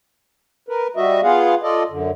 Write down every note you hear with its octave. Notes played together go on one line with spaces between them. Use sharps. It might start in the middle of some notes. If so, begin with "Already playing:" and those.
A#4 B4
G3 F#4 D#5 E5
B3 F4 G#4 F5 F#5
F4 A4 D5 D#5
F#2 D3